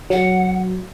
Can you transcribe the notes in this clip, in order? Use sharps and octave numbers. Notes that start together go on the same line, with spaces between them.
F#3 F#5